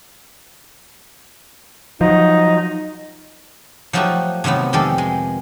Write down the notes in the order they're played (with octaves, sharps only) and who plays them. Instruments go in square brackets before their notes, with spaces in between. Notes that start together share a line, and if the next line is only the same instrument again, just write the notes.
[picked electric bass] F3 F#3 [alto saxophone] D#4
[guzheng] F3 F#3 A3 D#4 F#4 G4
C3 D#3 F#3 A3 B3
F2 D#3 G#3 G4 A4 D5
G#3